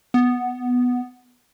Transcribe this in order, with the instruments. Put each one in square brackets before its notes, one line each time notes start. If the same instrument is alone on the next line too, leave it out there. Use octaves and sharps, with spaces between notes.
[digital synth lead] B3